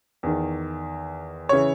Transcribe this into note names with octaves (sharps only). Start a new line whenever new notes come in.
E2 D#3
C#3 E3 C#5